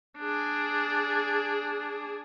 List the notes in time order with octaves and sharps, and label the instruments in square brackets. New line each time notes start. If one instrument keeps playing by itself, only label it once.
[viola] D4 G#4